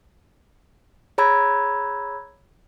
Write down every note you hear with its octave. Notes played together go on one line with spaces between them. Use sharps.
G#4 C#5 A#5 B5 E6 G#6